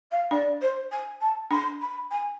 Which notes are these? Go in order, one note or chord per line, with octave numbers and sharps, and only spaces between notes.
F5
D4 D5
C5
G#5
A5
D4 C6
B5
G#5